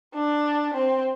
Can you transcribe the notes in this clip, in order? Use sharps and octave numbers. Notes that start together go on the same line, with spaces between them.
D4
C4